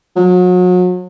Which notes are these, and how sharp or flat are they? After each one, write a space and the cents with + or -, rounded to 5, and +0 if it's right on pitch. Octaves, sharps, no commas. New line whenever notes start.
F#3 -35